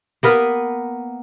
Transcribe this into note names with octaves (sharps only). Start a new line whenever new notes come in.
A#3 B3 A#4 B4